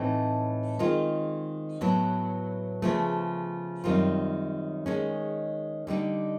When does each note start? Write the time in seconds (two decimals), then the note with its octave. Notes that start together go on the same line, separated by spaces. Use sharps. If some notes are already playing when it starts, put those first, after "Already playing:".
Already playing: A2 E3 A3 C4 D#4
0.79 D#3 G#3 C4 F4
1.81 A2 F#3 B3 E4
2.82 C#3 F3 A3
3.84 F#2 D#3 G3 C4 F4
4.86 D#3 G#3 C#4
5.87 D3 G3 B3 D#4